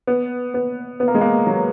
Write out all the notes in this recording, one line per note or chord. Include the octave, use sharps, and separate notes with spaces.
B3
B3
B3
A#3
G#3
A#3
F#3